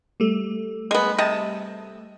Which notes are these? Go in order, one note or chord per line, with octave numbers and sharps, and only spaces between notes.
G3 A3
G#3 B3
C3 D#5 A5